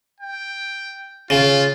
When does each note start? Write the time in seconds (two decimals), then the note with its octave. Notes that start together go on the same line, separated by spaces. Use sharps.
0.20 G5
1.30 C#3 F4